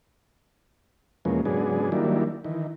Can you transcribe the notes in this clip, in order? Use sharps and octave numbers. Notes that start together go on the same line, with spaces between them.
E2 B2 F3 G#3 A#3 C#4
G#2 C#3 F#3 B3 D4 G#4
D#3 F#3 G3 A#3 D4 E4
D#3 E3